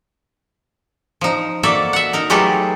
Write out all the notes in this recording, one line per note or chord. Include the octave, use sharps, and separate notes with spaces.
F3 D#4
A#3 F#4 A4 D5 E5
E5 F#5
D#4 A#4
F#3 G#3 A3 G4 A4 B4